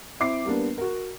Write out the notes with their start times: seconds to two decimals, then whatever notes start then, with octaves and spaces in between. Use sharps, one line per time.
0.20 C4 E4 D6 C7
0.45 G3 A#3 B3 D4
0.78 F#4 A#4